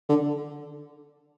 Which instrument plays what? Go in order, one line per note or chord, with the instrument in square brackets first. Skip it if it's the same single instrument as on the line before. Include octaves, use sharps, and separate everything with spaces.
[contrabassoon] D3